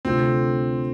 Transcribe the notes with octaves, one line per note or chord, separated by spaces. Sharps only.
D2 C3 A3 C4 F4